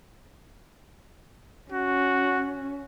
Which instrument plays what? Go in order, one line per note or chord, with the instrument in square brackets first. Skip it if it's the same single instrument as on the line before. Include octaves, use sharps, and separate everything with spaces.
[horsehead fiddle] C#4 [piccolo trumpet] F#4